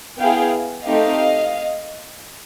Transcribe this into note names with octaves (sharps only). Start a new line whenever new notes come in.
B3 E4 G#4 F5 G5
A3 C4 D#4 G4 D#5 F5